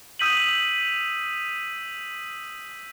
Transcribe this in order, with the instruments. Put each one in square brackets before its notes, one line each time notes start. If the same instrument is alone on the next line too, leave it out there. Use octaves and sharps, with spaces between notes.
[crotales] D#6 E6 G6 B6 D#7 F#7